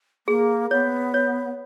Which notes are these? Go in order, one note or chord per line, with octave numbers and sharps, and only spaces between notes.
A#3 G#4
B3 C#5
C#5